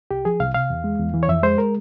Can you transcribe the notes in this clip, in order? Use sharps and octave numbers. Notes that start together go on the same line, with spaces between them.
C2 G4
F3 G#4
C2 F5
C3 F5
E2
G#3
E2
E3
C#5
F2 E5
G#3 C5
A#4